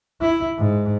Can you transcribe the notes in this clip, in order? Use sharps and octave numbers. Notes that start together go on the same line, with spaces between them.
E4
G#2